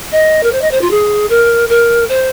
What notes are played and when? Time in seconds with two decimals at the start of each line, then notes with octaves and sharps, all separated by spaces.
0.11 D#5
0.43 A#4
0.52 C5
0.61 D#5
0.71 C5
0.81 F4
0.90 G#4
1.29 A#4
1.69 A#4
2.08 C5